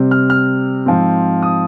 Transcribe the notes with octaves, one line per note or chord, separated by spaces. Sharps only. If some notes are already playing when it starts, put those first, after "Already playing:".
Already playing: C3 G3 C4
F6
F6
G#2 F3 C4
D#6